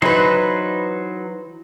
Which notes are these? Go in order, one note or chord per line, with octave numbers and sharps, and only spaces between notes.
E3 F#3 D#4 B4 C5